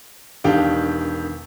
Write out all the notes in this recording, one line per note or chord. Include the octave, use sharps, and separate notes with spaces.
E1 D#3 D4 G4 F5 G5